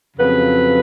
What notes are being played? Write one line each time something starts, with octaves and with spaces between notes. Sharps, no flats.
F2 C#3 F#3 B4